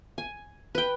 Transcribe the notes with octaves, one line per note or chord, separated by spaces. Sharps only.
G#5
B4 G5